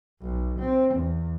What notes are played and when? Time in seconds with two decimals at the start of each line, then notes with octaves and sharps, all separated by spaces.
0.22 B1
0.60 C4
0.95 E2